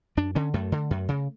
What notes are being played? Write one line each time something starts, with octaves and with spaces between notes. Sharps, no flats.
F#2 D4
D3 C#4
F#2 A3
D3
F#2
C#3